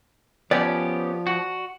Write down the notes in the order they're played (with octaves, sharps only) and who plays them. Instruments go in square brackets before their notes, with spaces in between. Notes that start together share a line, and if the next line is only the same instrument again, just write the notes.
[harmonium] F3 [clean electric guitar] B3 C#4 G4 [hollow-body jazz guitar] D5
[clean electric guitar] F#4